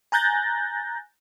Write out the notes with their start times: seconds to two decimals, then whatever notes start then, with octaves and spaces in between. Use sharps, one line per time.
0.12 G#5 A#5 F#6 G6 A6 A#6